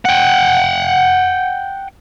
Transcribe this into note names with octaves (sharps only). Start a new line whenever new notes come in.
F#5 G5